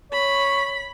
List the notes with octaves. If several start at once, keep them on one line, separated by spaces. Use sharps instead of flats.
C#5 B5